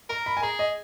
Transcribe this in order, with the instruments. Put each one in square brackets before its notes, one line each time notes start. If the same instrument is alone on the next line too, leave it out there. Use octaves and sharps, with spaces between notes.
[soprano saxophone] A#4 [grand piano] A#5
[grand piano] B5
G#5
[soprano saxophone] G#4 [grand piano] A#5
[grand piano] D#5